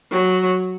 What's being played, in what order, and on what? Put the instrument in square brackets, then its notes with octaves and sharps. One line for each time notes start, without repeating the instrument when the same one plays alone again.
[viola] F#3